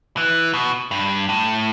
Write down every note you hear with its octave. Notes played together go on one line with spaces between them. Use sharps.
E3
B2
G2
A2